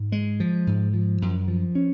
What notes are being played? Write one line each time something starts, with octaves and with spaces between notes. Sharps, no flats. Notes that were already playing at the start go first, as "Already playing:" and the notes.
Already playing: G#2
G#3
F3
G#2
F3
F#2
F3
C#4